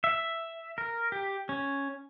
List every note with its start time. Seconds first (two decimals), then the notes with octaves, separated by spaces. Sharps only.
0.04 E5
0.78 A#4
1.12 G4
1.49 C#4